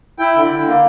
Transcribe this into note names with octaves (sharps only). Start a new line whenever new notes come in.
E4 G5
D3
D3
A#3